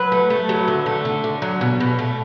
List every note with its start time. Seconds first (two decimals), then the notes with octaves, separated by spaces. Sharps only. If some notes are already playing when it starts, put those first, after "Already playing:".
Already playing: F#3 B4
0.12 A3
0.30 A3
0.49 F#3
0.68 D3
0.86 A3
1.05 D3
1.24 D3
1.42 F#3
1.61 B2
1.80 B2
1.99 A3